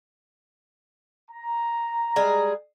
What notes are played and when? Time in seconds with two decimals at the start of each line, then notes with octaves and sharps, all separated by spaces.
1.31 A#5
2.16 G3 G#3 G#4